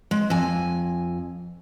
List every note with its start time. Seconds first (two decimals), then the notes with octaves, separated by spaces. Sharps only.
0.11 G#3
0.30 F2 G#5